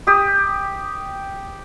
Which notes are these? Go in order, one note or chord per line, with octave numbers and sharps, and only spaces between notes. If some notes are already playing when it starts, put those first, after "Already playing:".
G4 D#6